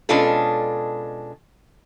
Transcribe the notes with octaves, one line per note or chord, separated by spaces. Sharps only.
B2 G#3 C#4 D4 F4 A4